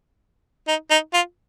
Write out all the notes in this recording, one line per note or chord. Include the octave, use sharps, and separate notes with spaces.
D#4
D#4
F4